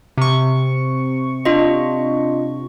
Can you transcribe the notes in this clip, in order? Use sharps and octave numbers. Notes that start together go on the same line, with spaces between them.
C3 C#6
D4 F4 D#5